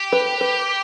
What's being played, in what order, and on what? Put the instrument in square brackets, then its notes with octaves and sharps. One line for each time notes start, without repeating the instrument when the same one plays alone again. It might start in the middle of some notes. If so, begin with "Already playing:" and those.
Already playing: [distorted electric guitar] G4
[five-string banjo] B4
B4